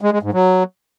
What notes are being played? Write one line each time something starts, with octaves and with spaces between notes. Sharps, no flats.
G#3
G#3
G#2
F#3